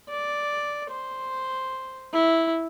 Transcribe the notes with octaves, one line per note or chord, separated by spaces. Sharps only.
D5
C5
E4